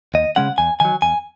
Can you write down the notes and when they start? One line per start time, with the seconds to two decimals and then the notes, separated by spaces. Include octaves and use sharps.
0.14 D#2 D#5
0.36 C#3 G#3 C#4 F#5
0.58 E2 G#5
0.80 D#3 F#3 G#5
1.02 E2 G#5